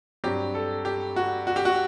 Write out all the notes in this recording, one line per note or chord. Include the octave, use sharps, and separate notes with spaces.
G2 F#3 C4 G4
A4
G4
F#4
F#4
G4
F#4